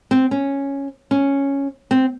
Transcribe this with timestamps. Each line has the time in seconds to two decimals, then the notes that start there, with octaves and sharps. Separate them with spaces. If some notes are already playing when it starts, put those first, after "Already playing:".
0.11 C4
0.31 C#4
1.11 C#4
1.91 C4